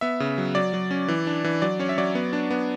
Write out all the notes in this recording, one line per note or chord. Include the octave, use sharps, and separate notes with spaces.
B3 E5
C#3
F#3
F#3 D5
F#3
C#4
E3
D4
E3
F#3 D5
C#4 C#5
E5
F#3 D5
B3
D4
B3